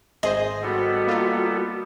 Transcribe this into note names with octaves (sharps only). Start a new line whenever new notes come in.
G#1 G#4 C5 D#5
G3 B3 F#4 A4
A#3 F4